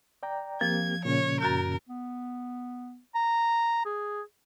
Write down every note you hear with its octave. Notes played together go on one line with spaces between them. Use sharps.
D5 G5 A#5
F3 A#3 C4 G4 G#6
A#2 C#3 C#4 C#5
F#2 F#4 A#4 G6
B3
A#5
G#4